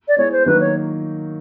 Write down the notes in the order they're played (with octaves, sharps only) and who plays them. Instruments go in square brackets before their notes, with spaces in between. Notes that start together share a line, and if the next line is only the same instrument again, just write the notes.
[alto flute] D5
[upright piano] G#3 B3 E4 G#4 [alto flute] C#5
[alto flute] C5
[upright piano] D#3 F#3 A#3 D#4 F#4 [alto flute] B4
[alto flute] C#5